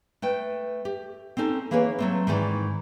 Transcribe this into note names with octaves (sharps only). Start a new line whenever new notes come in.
A3 B4 G5
G4
C4 C#4 D#4 A4
E3 A#3 G#4 B4 C#5
F#3 A3 C4
G#2 D#3 E3 B4 D5